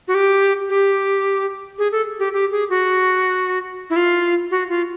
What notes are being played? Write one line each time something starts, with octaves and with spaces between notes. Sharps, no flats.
F#4
G4
G4
G#4
A4
G4
G4
G#4
F#4
E4
F4
F#4
F4